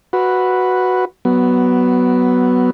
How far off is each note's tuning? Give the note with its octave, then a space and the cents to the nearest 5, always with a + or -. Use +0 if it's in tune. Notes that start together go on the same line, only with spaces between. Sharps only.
F#4 +0 B4 +0
F#3 +20 B3 +0